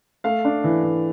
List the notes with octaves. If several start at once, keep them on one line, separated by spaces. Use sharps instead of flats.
A3 F5
D4
E3
E3